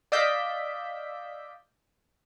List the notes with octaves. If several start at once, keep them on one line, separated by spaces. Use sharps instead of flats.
D5 D#5 F5 E6 G6 B6